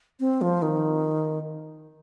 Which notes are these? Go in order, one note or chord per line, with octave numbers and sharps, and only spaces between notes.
C4
F3
D#3